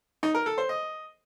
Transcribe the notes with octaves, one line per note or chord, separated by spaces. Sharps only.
D#4
A#4
A4
C5
D#5